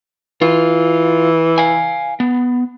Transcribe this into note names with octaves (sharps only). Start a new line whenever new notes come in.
E3 F4
F5 G#5
B3